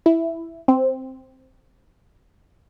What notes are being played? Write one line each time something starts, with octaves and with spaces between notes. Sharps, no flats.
E4
C4